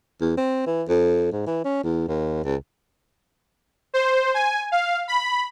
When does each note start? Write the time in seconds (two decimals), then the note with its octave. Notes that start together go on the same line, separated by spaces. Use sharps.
0.21 E2
0.37 C4
0.66 E3
0.88 F2
1.32 G#2
1.47 E3
1.65 C#4
1.84 E2
2.08 D#2
2.44 C#2
3.94 C5
4.34 G#5
4.72 F5
5.08 B5